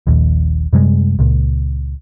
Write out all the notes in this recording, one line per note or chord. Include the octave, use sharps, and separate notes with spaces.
D#1 A#1 D#2
F#2 C3 G3 G#3
C#2 A#2